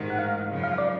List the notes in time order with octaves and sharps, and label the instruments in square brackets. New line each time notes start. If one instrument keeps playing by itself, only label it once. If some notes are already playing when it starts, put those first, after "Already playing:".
Already playing: [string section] A1 G#2 D#3
[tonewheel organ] F#5
F5
[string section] F#2 C#3 F3
[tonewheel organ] F5
D5